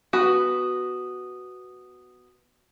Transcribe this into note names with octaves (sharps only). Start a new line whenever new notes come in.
B3 F#4 B4